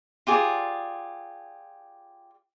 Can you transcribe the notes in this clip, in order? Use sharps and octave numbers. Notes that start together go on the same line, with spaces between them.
F4 G4 G#4 D5